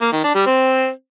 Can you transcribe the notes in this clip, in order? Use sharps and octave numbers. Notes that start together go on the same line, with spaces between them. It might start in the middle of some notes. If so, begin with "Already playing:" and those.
A#3
D#3
D4
G3
C4